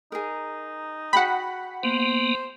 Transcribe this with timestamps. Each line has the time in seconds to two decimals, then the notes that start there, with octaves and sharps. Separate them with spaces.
0.12 D#4 G#4 A#4
1.13 F#4 G#4 F#5 G5 B5
1.83 A#3 B3 C5